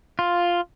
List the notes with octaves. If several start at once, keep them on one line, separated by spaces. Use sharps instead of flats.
F4